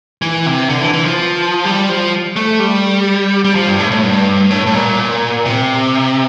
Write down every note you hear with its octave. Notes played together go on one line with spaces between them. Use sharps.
E3
C3
D3
E3
E3
F3
G3
F3
A3
G3
G3
F3
G2
A2
A2
G2
A2
A2
A#2
C3